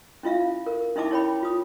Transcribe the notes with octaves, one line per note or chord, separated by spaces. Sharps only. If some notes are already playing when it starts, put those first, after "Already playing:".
C#4 E4 F4 E5 F5
A#4
C#4 D#4 E4 E5 A5 D6
E4 C#5 G5 B5
F4 D#6